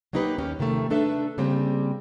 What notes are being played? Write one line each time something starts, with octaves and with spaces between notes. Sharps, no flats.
F#3 A#3 D#4 G4 B4
D#2 C#4 G4
C3 D#3 F3 A3
A3 D4 A4 B4 E5
C#3 G3 A#3 C4